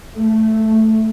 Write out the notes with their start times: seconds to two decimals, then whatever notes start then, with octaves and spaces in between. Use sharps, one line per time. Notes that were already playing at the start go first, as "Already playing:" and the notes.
0.14 A3